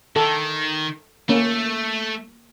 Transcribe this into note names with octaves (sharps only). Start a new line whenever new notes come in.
D#3 A4
A3 A#3 C#4